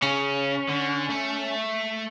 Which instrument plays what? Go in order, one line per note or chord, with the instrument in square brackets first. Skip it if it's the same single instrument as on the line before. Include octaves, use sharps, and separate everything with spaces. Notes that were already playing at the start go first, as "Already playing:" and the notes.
[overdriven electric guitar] C#3 [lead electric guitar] C#4
[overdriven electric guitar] D3
A3